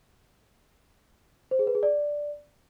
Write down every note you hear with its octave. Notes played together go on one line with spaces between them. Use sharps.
C5
G#4
B4
G#4
D5